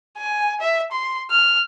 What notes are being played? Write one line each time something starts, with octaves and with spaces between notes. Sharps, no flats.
G#5
E5
C6
F6